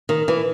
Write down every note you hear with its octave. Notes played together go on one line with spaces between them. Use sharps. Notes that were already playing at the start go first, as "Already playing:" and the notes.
D#3
E3